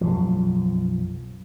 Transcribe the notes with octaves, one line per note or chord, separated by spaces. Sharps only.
B1 F#2 F3